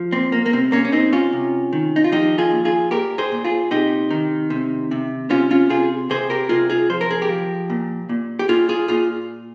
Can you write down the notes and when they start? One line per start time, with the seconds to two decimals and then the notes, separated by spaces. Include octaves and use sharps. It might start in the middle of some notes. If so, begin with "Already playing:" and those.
Already playing: F3
0.12 A#2 C4
0.32 A#3
0.46 A#3
0.53 C3 C4
0.72 A#3 C#4
0.85 C#4
0.92 C3 C4 D#4
1.13 C#4 F4
1.33 C3
1.73 D#3
1.96 D#4
2.04 F4
2.12 F3 D#4 G4
2.38 F4 G#4
2.51 A#2
2.65 F4 G#4
2.91 A#2 G4 A#4
3.18 G#4 C5
3.32 A#2
3.45 F4 G#4
3.71 C3 D#4 G4
4.11 D#3
4.50 C3
4.91 C3
5.30 C3 C#4 F4
5.51 C#4 F4
5.70 C3 F4 G#4
6.10 C3 G#4 C5
6.30 G4 A#4
6.49 C3 F4 G#4
6.70 F4 G#4
6.90 F3 C5
7.01 A#4
7.11 G#4
7.22 G4 A#4
7.29 F3
7.70 A#2
8.09 A#2
8.39 G4
8.49 A#2 F4 G#4
8.69 F4 G#4
8.88 A#2 F4 G#4